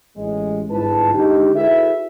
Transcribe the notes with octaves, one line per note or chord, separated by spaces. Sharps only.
A1 G#3
G1 G#2 E4 F4 B4 A5
D3 G#3 D4 D#4 G4
E4 F#4 G#4 A4 B4 E5